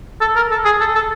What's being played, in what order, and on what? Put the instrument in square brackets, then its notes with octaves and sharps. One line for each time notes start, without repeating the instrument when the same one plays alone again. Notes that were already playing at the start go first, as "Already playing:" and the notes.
[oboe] A4
A#4
A4
G#4
A4
A4